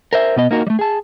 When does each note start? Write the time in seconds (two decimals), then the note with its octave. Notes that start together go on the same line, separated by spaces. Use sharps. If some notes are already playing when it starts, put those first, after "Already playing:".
0.13 A#4 C5 E5
0.36 B2 B3 D#5
0.51 A#3 D#4 F#4 A#4
0.67 G3 A3
0.79 G#4 A5